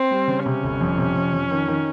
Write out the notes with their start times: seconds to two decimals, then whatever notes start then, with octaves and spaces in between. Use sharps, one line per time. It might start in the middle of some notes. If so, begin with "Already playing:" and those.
Already playing: C4
0.11 G3
0.28 C#3
0.46 C3 C#4
0.63 G1
0.81 F2
0.98 C3
1.16 F2
1.33 F2
1.51 D#3
1.68 D#3